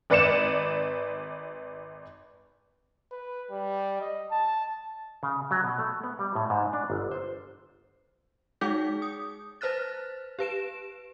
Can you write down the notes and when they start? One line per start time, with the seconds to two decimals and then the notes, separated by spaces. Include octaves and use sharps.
0.10 G#1 B4 D5 C#7 E7
3.11 B4
3.50 G3
4.01 D#5
4.31 A5
5.23 C#3
5.51 F#3
5.64 B2
5.78 A3
6.04 B3
6.19 G3
6.35 A2
6.50 G#2
6.73 D4
6.90 G1
7.11 C5
8.61 G#3 D#4 G#4 D6 G6 B6
9.02 D#6
9.61 B4 C5 F6 F#6 A6
10.39 G4 B4 D7 E7